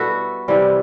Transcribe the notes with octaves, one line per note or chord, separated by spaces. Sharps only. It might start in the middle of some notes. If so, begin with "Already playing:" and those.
Already playing: B2 G3 E4 F#4 A4 B4
C3 E3 G3